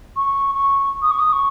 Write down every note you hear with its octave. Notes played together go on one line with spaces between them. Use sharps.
C#6
C#6
D#6
C#6
D#6
C#6